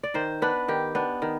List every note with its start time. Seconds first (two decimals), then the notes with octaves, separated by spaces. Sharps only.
0.03 D5
0.14 D#3 C5
0.42 B3 D4 B4
0.68 D#3 G4
0.95 B3 D4
1.22 D#3